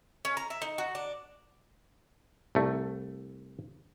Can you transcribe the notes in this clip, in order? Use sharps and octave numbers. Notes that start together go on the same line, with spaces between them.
C#4
A#5
E5
D#4
F#4
D4
C2 A3